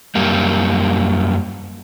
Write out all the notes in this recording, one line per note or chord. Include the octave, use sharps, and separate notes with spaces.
F#2 G3 A#3